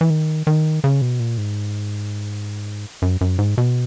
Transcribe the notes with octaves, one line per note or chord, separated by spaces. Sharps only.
E3
D#3
D#3
C#3
B2
A#2
G#2
F#2
F#2
G#2
B2